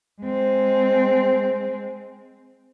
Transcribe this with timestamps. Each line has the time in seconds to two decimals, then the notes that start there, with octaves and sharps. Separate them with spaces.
0.22 G#3 C4